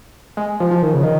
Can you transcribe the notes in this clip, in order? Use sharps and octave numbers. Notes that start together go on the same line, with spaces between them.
G#3
F3
F3
D#3
C#3
D#3